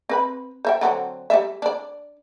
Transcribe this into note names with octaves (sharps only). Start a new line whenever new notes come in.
C4 B4 B5
C5 E5 G5
D3 F#3 C4
G3 B3 E5
D4 D5